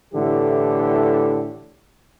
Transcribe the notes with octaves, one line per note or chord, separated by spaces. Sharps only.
A2 D3 E3 A3 G4